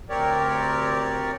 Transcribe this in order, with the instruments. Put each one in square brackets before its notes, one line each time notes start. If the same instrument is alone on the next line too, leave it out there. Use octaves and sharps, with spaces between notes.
[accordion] D2 C4 G4 A#4 C#5 D5